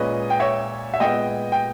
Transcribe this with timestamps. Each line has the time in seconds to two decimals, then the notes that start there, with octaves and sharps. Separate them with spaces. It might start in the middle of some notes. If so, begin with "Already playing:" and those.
Already playing: A#2 G#3 C#4 B4 D#5
0.30 G5
0.40 C#5 E5
0.94 E5
1.00 A#2 G#3 B3 D#5 G5
1.52 G5